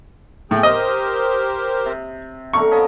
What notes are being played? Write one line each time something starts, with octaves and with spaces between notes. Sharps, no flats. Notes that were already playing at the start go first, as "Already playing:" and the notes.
A2 G#4 G5
G4 A#4 C5 D#5
C3
D3 A3 A#4 C#6
F3 B3 C#4 D#5